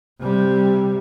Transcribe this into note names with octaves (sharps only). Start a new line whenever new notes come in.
C3 G3